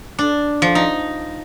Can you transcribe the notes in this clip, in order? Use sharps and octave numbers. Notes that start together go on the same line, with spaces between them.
D4
F3
D#4